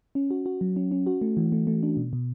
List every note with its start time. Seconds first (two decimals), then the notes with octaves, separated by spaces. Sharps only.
0.15 C#4
0.31 F#4
0.46 F#4
0.61 F#3
0.76 C#4
0.91 C#4
1.06 F#4
1.21 A3
1.37 E3
1.52 A3
1.67 A3
1.83 D4
1.97 B2
2.13 B2